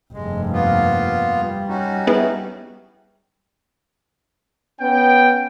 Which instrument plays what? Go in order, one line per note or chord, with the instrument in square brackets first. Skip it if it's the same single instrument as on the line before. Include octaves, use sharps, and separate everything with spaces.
[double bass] F1 G2 [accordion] G#3
[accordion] A#3 B3 F4
[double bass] G3
[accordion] C#4 D#4 F#4
[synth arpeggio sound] B3 E4 G#4
[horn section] B3 C#4 G5